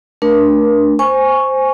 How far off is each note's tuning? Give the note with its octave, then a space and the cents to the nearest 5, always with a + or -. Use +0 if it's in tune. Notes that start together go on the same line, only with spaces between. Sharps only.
A3 +0 D4 +0 A#4 +35
C5 +0 G#5 +0 C#6 +0